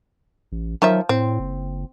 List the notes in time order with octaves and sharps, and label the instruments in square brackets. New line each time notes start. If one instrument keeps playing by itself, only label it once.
[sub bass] A1
[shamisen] D#3 F3 E5 [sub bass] F#3
[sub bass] A2 [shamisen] C4
[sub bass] F#1